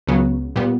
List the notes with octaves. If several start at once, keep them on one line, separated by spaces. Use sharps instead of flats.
C#2 C#3 F#3 B3
A#2 G3 B3